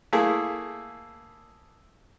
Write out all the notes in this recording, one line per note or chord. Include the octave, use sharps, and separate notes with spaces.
A3 A#3 E4 G#4